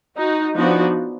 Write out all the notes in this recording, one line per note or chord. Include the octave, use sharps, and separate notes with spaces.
D#4 F#4
F3 B3 D4 D#4 F#4